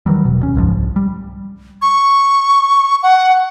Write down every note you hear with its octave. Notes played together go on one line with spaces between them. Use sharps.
D#3 E3 F#3 G3
E1 B2
D#2 C#4
F#1 C#2 G#2 F3
C2
G3
C#6
F#5